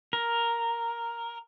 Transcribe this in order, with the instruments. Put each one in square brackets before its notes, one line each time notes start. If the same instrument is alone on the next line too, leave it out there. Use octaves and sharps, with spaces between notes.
[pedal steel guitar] A#4